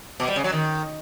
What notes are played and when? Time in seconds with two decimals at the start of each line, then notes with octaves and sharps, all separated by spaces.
0.20 B2
0.28 G3
0.36 C#3
0.44 F#3
0.52 D#3